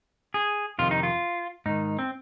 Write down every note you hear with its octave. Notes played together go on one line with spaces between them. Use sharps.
G#4
F2 C3 D#3 F4
D#4
F4
G#2 D#3 D#4
C4